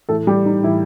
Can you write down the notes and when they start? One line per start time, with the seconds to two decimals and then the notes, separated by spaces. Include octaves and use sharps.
0.09 A2 E3 A3 A4
0.27 G3 G4
0.46 D#4
0.64 A2 E3 E4